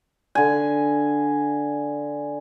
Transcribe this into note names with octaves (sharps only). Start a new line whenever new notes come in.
D3 G#5